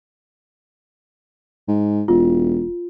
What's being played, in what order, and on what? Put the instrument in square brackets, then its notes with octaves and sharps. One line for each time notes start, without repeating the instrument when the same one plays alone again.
[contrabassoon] G#2
[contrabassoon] E1 [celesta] F4